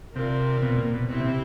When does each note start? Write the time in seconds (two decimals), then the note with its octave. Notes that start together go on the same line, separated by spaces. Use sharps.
0.16 C3 C4 F4 A#4 D5
0.63 B2
0.78 A#2
0.94 B2
1.08 B2 C4 E4 G4 C5
1.20 C3